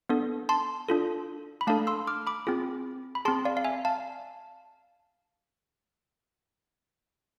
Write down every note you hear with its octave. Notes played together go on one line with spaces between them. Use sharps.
B3 D4 A4
A5 C6
D4 F4 A4
B5
A3 D4 A4 F5 A5
C6 E6
D6 F6
B5 D6
C4 F4 G#4
B5
C4 G#4 A5 C6
D5 F5
F5
E5 G#5
F5 A5